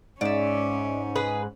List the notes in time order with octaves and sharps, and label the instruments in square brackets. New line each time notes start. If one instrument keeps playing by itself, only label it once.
[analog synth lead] G#2 [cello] C#4 [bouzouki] D5 E5
[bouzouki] G#4 B4